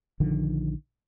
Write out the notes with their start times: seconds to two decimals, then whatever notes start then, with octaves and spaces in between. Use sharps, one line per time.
0.20 A#1 D3 D#3 F3